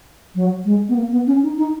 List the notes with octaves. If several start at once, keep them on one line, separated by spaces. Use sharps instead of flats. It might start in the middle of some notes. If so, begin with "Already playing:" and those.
F#3
G#3
B3
A#3
B3
C#4
D#4
D#4